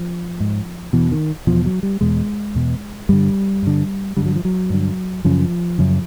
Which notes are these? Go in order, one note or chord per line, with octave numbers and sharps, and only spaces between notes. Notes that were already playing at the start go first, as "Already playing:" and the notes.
Already playing: F3
G#2
E2 B2 E3
D#3
E2 B2 F3
F#3
G3
E2 B2 G#3
E2 B2
G2 D3 G3
G2 D3
G2 D3 G3
F#3
F3
F#3
G2 D3
F#2 C#3 F3
F#2 C#3